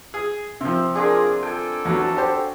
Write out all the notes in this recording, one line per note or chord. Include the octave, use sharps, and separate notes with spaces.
G#4
C3 F3 C4
D4 F4 G#4 A#4
A4 G5 G#5
E2 F#3 F#4
G4 C5